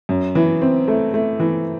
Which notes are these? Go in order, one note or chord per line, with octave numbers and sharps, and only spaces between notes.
F#2
E3
C4
A3
A3
E3